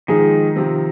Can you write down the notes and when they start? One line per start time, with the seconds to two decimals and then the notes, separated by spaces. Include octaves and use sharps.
0.08 G#2 D#3 F3 G#3 D#4 G#4
0.56 C3 F3 C4